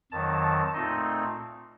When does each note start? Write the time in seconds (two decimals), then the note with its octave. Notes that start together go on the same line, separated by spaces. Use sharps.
0.12 F2 D#3 F#3 A5
0.42 A5
0.73 A#2 A3 C4 D#4 D#5